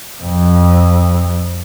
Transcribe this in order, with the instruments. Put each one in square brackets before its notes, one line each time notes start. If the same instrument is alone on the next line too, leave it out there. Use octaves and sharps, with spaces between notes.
[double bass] F2